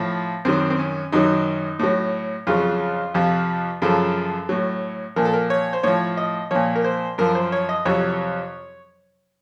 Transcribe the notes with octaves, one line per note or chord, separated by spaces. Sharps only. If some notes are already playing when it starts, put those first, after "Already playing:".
Already playing: A2 F3
F#2 D#3 F#3 C4
C4
C#4
F#2 D#3 F#3 D#4
A2 F#3
F2 C#3 F#3 F4
F2 C3 F3
F#2 C#3 F3 A4
A2 F#3
A#2 F3 A#4
A4
A#4
C#5
C5
A2 F3 C#5
D#5
A#2 F3 C#5
A#4
C5
F#2 F3 A#4
C5
C#5
D#5
F2 C3 F#3 C#5